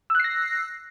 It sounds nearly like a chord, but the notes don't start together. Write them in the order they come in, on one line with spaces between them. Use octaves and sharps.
E6 F#6 C7 A#6